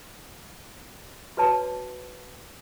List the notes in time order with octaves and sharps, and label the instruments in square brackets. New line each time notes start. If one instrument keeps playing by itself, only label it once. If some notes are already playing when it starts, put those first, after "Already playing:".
[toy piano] F#4 B4 C#5 A5